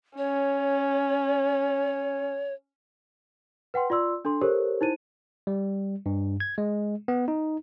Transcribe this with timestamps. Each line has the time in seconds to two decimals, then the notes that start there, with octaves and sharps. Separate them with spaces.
0.18 C#4 C#5
3.74 B4 F#5 G5 C6
3.90 F4 D5 C6 E6
4.25 D4 A4 C6
4.41 G4 A4 A#4 C5 C#5
4.81 D#4 E4 C5 D#7
5.47 G3
6.06 G2
6.40 G#6
6.58 G#3
7.08 B3
7.28 D#4